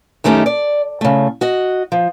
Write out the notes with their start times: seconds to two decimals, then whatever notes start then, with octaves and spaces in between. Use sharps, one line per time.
0.24 F#2 D#3 A3 C#4 D#4 G4
0.46 D5
1.01 C#3 A3
1.41 F#4 D#5
1.92 F3